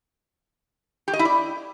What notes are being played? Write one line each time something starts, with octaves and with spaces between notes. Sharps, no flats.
G4
D#5
E4
D5